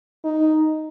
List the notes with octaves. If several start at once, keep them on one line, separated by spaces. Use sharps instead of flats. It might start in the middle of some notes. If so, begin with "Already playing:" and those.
D#4